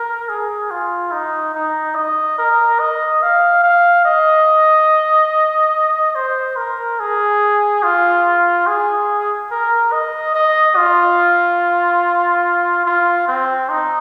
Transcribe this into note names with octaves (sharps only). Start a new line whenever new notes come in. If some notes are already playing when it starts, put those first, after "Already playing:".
Already playing: A#4
G#4
F4
D#4
D#4
D#5
A#4
D#5
F5
F5
D#5
C5
A#4
G#4
F4
G#4
A#4
D#5
D#5
F4
F4
C4
D#4